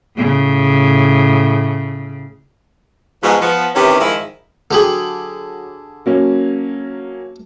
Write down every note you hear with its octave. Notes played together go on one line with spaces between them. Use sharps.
A2 C#3
G#2 B2 F3
F3 B3
C3 D#3 E3 C#4 G4 B4
G#2 D#3 F3 E4
D3 F#3 G4 G#4 F#7
F#3 A#3 C#4